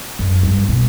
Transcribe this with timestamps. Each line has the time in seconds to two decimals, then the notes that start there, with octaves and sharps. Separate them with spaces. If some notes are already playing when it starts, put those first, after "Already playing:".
0.19 F#2
0.43 G2
0.69 B2